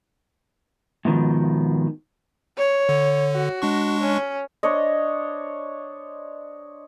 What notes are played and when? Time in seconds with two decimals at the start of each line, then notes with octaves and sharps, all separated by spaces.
1.05 G#2 B2 D#3 F3
2.57 C#5
2.89 D3
3.32 F#4
3.62 G#3 D4 C#6
4.00 C#4
4.63 D4 C5 C#5 D#5